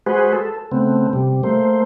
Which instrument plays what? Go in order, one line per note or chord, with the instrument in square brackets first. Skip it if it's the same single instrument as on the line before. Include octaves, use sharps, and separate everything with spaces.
[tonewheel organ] G#3 F#4 G#4 B4 C5
A4
C#3 A3 B3 C4
C3 G3
A3 A#3 C5